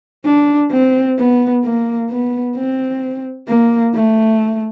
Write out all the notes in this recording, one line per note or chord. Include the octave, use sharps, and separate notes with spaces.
D4
C4
B3
A#3
B3
C4
A#3
A3